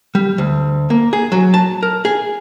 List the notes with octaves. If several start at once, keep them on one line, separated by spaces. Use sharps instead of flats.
G3
D2
A#3
G#4
F#3
A5
A#4
G#4